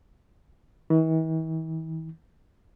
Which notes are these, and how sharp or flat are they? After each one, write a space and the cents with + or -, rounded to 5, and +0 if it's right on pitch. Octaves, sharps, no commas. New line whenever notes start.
E3 -45